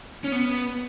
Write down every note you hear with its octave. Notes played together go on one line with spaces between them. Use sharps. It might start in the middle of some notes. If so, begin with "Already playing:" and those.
C#4
B3